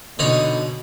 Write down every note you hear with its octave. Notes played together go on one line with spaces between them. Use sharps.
B2 D3 D#4 C#5